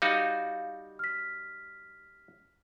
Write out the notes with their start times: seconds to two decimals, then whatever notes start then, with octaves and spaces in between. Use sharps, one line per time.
0.02 G3 D#4 F#4 F5
0.99 F6 B6